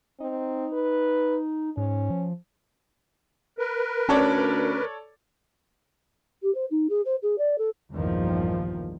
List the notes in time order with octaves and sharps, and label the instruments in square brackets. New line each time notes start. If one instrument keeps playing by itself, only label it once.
[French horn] C4 [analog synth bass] D#4
[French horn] B4
[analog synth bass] G#2 [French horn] C#4
[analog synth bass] F3
[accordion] A#4 B4
[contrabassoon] D2 [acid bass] C#4 [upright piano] A4 C#5 D5
[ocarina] G4
C5
D#4
G#4
C5
G#4
D5
A4
[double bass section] A#1 E2 G2 D#3 F3